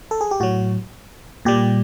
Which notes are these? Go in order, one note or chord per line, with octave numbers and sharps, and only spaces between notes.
A4
G#4
G4
A2 F#3 F#4
A#2 G3 G4